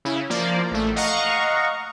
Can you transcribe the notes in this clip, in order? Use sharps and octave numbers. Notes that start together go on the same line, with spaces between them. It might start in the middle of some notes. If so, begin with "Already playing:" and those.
C#3 E4
F3 A#3 D5
A1 A3
D#5 F5 F#5 A#5 C#6